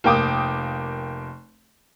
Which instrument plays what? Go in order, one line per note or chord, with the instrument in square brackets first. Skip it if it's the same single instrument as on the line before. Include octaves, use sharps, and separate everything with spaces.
[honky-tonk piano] F1 A#3 G5 D6 D#6